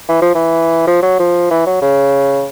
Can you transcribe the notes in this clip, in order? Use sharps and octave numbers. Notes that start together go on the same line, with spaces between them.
E3
F3
E3
F3
F#3
F3
E3
F#3
C#3